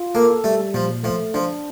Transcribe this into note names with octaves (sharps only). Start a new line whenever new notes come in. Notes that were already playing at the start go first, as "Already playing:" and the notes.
Already playing: F4
A#3 A4
G3 A3
A#2 F3
F3 A3
F3 D4